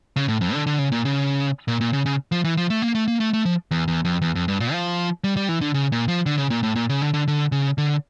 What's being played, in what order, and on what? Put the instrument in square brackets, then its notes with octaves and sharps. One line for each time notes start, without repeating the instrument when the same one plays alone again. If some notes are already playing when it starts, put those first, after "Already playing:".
[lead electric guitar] C#3
A2
F2
D3
D3
C#3
A#2
C#3
A#2
A#2
C#3
C#3
F3
E3
F3
A3
A#3
A3
A#3
A3
A3
F3
E2
E2
F2
E2
F2
G2
A#2
F3
G3
G3
E3
D3
C#3
A#2
F3
D3
C#3
A#2
A2
A#2
C#3
D3
D3
D3
C#3
D3